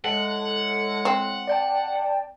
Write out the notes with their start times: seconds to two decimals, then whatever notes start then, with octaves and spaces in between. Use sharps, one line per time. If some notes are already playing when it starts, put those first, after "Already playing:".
0.05 A2 G#3 A4 F#5
1.05 C4
1.47 D5 G5 A5